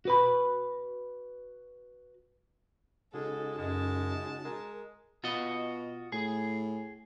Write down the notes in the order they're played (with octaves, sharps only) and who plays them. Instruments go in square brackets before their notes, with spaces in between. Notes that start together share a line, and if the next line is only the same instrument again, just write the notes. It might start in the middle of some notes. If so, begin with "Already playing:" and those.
[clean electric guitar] F#4 B4 B5
[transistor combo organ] C#3 D#4 F#4 [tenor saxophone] G#3 [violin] A4
[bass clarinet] F#2 [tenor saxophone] G#3 [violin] A5
[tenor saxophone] G#3 [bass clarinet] A#4
[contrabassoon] B2 [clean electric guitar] F4 F#4 D#5
[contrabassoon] A2 [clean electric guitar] G#4